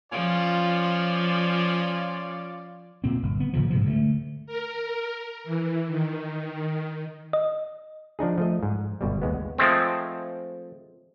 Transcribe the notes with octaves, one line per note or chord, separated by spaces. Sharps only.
F3 C#4 F4 D5
A#2 C4
G1
B3
G#1 A#2 C#3 F3
G#2 C3 F3
D3 G#3 A3
A#4
E3
D#3
D#5
F3 D4 D#4 G#4
F3 A3 D#5
G#2
G1 B2 G3
D#2 G#3 B3
F3 G#3 A3 C4